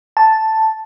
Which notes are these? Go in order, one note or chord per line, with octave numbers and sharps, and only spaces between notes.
A5